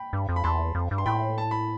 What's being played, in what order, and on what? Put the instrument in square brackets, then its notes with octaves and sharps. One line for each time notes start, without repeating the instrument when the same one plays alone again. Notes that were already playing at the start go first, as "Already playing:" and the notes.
Already playing: [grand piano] G5 B5
[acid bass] G2
F2
[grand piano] B5
[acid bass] E2 [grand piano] A5 C6
[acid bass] F2
G2
[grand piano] C6
[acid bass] A2 [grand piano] G5 B5
[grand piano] A5
B5